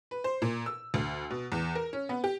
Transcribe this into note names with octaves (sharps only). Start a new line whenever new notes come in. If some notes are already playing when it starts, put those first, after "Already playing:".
B4
C5
A#2
E6
D2
B2
E2
A#4
C#4
B3
G4